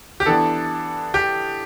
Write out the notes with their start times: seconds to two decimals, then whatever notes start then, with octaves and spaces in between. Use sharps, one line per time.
0.20 G4
0.26 E3 B3 D4 A4
1.14 G4